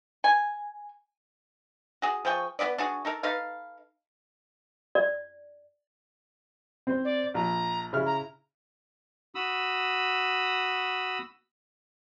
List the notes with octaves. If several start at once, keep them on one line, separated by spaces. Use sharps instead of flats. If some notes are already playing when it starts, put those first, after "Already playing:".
G#5
F#4 G#4
F3 G#4 G5 C#6
B3 F#4 B4 D5
D4 F#4 G#4
D#4 A4 A#4
D#4 A4 B4 F5
D5
C4 C5
D5
A#1 A#5
C#3 E4 F6
A#5
F#4 B5 D#6 E6